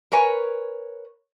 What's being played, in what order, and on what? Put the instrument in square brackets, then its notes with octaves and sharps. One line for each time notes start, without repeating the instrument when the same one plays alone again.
[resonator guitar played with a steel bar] A#4 B4 C#5 G#5